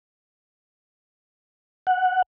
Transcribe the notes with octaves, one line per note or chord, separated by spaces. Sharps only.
F#5